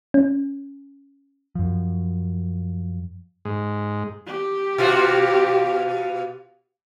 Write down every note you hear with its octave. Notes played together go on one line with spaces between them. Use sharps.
C#4
F#2 F3
G#2
G4
B2 F4 F#4